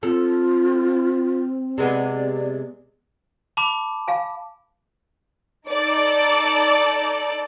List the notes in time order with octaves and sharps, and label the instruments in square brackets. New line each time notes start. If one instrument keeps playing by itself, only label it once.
[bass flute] C4 [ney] F4 [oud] A4
[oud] C3 G#3 B3 [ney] D5
[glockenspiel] A5 B5 D6
[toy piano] F5 G#5
[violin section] D#4 A4 D5